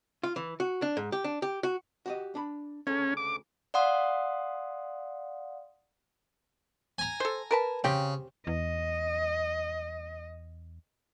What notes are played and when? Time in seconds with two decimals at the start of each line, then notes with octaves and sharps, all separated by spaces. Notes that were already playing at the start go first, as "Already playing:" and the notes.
0.23 F4
0.36 E3
0.60 F#4
0.82 D4
0.97 G#2
1.12 G4
1.24 D4
1.42 G4
1.63 F#4
2.06 F#4 G4 D#5
2.35 D4 B5
2.87 D2 C#3 C#4 A4
3.17 D6
3.74 D5 F5 F#5 C6 D#6
6.98 G#5 A#5
7.20 A4 C5
7.51 A#4 B4 A5
7.84 C#3 C4 G4
8.47 E2 D#5